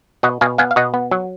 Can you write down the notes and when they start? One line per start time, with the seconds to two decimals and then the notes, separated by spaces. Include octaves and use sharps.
0.23 B2 D#5 F#5
0.41 B2 F5 G#5
0.58 B3 F5 G#5
0.71 F5
0.76 B2 D#5 F#5
0.94 B3
1.11 F#3